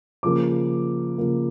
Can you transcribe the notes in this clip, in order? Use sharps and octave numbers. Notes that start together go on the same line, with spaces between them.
C#3 F3 A#3 D6
C#3 F3 A#3